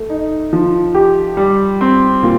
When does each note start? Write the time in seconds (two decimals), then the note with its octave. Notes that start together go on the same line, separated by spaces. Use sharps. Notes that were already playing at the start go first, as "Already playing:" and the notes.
Already playing: A3
0.10 D#4
0.53 F3
0.95 G4
1.37 G3
1.81 C4
2.23 A#2